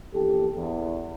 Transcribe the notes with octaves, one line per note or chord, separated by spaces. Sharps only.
A#1 E2 G4 A4
E2